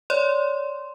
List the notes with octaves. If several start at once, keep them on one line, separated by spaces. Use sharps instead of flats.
C#5 D5 C6